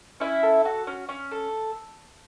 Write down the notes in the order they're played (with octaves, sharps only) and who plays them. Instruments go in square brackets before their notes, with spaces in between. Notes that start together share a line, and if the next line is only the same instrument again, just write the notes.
[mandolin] C#4 E4 E5
A4
F#4
C#4
C#4
A4